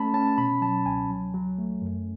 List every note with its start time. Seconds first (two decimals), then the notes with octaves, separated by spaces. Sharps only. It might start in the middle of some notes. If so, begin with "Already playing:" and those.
Already playing: A3 C#4 A5 B5
0.14 C#4 A5
0.38 B2 B5
0.61 F#3 A5
0.85 C#2 G#5
1.10 F#3
1.34 F#3
1.58 A3
1.82 F#2